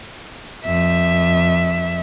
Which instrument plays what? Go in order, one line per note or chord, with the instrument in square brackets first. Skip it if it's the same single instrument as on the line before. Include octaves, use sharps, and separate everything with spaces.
[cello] F2 E5